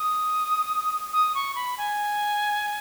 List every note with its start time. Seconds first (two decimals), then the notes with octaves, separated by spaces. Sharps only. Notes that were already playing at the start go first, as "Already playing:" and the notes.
Already playing: D#6
1.13 D#6
1.35 C#6
1.55 B5
1.78 G#5